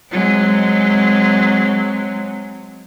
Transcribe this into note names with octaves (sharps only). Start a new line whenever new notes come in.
F#3 G#3 C4